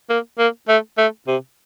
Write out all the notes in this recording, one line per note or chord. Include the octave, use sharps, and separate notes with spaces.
A#3
A#3
A3
A3
C3